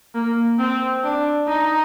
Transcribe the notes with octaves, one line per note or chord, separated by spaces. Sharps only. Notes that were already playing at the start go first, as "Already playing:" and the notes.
A#3
C4
D4
D#4